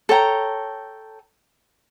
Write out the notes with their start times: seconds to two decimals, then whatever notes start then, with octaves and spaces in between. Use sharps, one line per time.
0.09 A4 C#5 G5 A#5